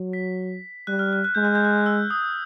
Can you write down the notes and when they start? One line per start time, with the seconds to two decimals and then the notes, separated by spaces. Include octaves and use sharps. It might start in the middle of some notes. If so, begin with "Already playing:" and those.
Already playing: F#3
0.13 B6
0.87 G3 F#6
0.99 F6
1.13 F#6
1.24 F#6
1.35 G#3 G6
1.45 F#6
1.55 G6
1.65 F#6
1.86 E6
2.10 D#6